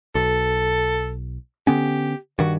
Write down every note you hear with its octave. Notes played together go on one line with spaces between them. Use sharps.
B1 A4
D3 B3 C#4 G4
G2 D#3 F#4